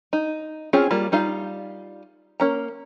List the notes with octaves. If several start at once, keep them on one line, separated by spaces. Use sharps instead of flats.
D#4
C4 C#4 F4 G#4
G3 A#3 F4
G3 D#4 F4 F5
A#3 C#4 A#5